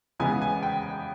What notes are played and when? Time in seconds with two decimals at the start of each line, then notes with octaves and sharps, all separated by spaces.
0.19 C#3 E3 G#3 B3 G#5
0.42 G#5
0.63 G5